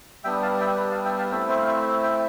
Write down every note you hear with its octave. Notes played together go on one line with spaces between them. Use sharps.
G3 B3 D4 E5 G5
F5 A5
E5 G5
G4 B4
F5 A5
E5 G5
F5 A5
A3 C4 E4 E5 G5
C5 E5
F5
C5 E5
E5 G5